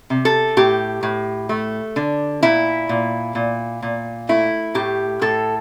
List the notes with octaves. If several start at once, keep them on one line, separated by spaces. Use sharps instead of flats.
C3
A4
A2 G4
A2
A3
D3
A#2 E4
A#2
A#2
A#2
A3 E4
A2 G4
A2 A4